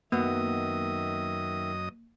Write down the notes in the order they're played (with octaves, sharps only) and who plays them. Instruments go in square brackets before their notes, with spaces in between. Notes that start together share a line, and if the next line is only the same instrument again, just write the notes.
[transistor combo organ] F#2 D#5 D#6 [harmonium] D#3 E5 [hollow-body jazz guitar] F#3 B3 [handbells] A#3